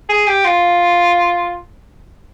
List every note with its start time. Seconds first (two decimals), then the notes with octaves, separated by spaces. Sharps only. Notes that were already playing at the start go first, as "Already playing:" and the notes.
0.09 G#4
0.27 G4
0.45 F4